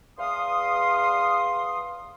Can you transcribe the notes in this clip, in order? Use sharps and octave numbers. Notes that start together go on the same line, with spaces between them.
E2 F5 C6 D#6